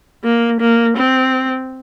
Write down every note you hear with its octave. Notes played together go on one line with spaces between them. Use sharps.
A#3
A#3
C4